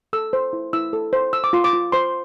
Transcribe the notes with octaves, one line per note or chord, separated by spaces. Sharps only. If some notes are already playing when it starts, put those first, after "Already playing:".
A4 E6
C5
E4
E4 E6
A4
C5
C5 E6
D6
F4 C6
D6
F4
C5 C6